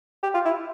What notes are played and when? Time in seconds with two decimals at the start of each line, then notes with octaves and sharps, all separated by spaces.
0.23 G4
0.34 F4
0.45 E4